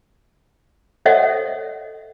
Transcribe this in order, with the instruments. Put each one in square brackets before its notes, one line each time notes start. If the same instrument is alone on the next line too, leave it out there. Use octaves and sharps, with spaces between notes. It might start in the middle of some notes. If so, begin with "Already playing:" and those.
[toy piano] A4 C5 C#5 D#5 E5 F#5